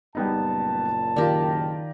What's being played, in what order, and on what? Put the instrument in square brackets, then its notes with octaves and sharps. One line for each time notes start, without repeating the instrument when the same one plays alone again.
[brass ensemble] F#1 A#2 A5 [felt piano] G3 B3 D#4
[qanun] D#3 G4 [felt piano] F4 A#4 D5